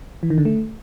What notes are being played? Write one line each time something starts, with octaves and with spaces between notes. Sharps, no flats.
E3
D#3
D3
A3